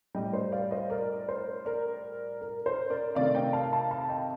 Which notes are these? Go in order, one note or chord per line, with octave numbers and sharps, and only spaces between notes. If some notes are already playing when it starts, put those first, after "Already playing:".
A2 G3 D#5 G5
D5
C5 D#5
D5 F5
C5 D#5
A#4 D5
C5
A#4 D5
A#4
C5
A#4 D5
C3 D#3 A3 D5 F5
D#5 G5
F5 A5
F5 A5
F5 A5
D#5 G5